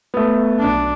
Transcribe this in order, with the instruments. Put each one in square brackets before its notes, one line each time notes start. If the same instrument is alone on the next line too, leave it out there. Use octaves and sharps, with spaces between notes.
[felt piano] A3 B3
[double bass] B1 D4